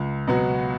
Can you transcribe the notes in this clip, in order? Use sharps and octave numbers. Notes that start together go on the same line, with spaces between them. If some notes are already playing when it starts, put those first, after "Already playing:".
Already playing: C#2
B2 F#3 B3 F#4